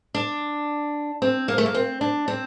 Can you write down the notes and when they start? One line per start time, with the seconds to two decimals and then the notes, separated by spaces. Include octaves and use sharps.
0.14 D4
1.22 C4
1.48 A#3
1.58 A3
1.66 A#3
1.74 C4
2.01 D4
2.28 C4